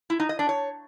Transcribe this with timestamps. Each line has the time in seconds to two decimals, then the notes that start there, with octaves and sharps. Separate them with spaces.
0.10 E4
0.20 D#4
0.29 D#5
0.39 D4
0.49 C#5